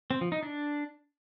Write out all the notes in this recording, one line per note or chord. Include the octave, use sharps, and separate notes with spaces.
C4
F3
D#4
D4